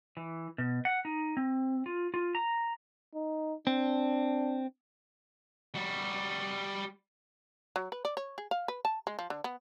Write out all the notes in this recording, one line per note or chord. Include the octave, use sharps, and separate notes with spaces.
E3
B2
F#5
D#4
C4
F4
F4
A#5
D#4
C4 D4
G3 F#4
F#3
B4
D5
C#5
G#4
F5
B4
A5
G#3
F3
D3
B3